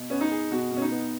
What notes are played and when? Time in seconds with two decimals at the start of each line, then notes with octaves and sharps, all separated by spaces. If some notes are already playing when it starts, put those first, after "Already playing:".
Already playing: B2
0.10 B3 C#4
0.21 D#4
0.31 G#4
0.51 B2 F#4
0.71 B2
0.77 C#4
0.82 D#4
0.92 B3